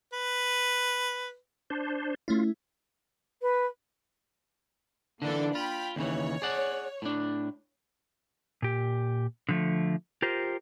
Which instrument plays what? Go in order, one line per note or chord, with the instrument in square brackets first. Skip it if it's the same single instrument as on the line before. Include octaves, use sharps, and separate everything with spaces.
[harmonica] B4
[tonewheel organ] D4 C5
[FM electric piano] A3 C#4 E4 [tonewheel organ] F4
[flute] B4
[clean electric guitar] D3 E3 [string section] A#3 D4 A4
[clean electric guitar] F4 [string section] G5 B5
[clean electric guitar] D#2 C#3 E3 [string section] C#5
[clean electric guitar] G#4 D5 F#5
A2 D4
[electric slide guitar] A#2 G4
D3 F3 A3
F4 G4 A#4 C5